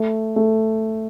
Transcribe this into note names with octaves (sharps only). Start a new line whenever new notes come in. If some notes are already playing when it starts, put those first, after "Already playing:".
Already playing: A3
A3